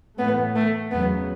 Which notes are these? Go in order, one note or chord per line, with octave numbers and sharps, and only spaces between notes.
A2 E3 A3 B3
A3
E2 C#3 F#3 B3